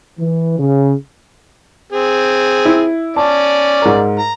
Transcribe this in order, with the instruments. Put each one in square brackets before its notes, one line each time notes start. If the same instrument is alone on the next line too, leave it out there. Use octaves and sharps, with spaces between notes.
[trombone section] E3
C#3
[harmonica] C4 G#4
[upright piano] E4
[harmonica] C#4 D5 [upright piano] A5
[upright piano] G#2 A#4
[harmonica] A#5